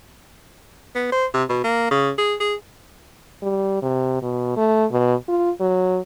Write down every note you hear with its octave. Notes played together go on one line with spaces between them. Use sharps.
B3
C5
C3
B2
A#3
C#3
G#4
G#4
G3
C3
B2
A3
B2
F4
F#3